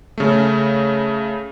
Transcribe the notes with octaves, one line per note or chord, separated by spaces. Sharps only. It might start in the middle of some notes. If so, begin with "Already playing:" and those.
C#3 A3